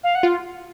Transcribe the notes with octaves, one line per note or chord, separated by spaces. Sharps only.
F5
F#5
F4